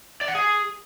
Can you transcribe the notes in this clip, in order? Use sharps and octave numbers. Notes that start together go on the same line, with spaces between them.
D5
F#5
G#4